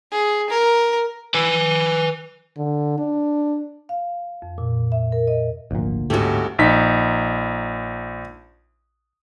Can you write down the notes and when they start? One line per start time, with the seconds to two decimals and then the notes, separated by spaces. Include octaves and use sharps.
0.12 G#4
0.50 A#4
1.34 B4 G#5
2.57 D3
2.98 D4
3.89 F5
4.42 F2
4.58 A#2
4.92 E5
5.12 A#4
5.27 D#5
5.71 G#1 D2 A#2 F3
6.10 A1 G#2 A3 C#4 F#4 G4
6.59 A#1 D#4 B6